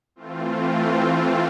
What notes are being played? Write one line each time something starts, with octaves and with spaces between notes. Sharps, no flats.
E3 A3 C4 F4